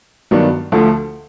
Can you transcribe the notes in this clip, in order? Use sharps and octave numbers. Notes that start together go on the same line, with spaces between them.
G2 D#3 F#3 B3 D4
D2 D3 F3 A3